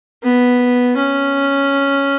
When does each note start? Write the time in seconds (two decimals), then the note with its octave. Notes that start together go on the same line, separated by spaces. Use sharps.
0.23 B3
0.96 C#4